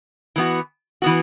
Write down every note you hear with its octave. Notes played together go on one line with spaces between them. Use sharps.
E3 B3 F#4
E3 B3 F#4